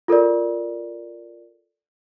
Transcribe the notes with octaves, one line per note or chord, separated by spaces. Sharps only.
F4 A4 A#4 D5